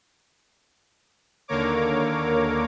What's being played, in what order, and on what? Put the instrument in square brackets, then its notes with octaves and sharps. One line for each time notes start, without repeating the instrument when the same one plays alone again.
[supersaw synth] D#2 D3 A#3 A#4 C#5 D6